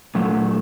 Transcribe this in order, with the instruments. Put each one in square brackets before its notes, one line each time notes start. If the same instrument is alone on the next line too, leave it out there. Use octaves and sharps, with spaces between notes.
[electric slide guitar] A#2 F#3 A3